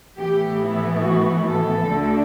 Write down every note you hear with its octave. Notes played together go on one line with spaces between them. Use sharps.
A2 E3 B3 G4
E4
F#4
A4
D2 D3 A3 D4